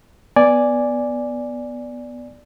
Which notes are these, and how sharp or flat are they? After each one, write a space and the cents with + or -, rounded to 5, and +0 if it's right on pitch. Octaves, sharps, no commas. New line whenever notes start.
B3 +0 D5 +0 G#5 -5